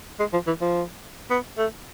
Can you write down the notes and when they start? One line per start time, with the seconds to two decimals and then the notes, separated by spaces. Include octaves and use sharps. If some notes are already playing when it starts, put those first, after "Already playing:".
0.20 G#3
0.33 F3
0.47 E3
0.61 F3
1.30 B3
1.58 A3